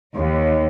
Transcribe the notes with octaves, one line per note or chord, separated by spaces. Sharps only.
D#2